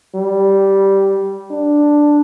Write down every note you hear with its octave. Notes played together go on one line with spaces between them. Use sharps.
G3
D4